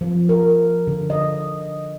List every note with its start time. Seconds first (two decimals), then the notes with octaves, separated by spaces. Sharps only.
0.01 F3
0.29 A#4
0.87 D3
1.10 D#5